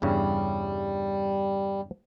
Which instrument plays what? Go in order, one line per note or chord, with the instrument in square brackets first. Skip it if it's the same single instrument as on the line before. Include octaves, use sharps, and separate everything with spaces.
[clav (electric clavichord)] E2 G2 C#3 [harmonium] G3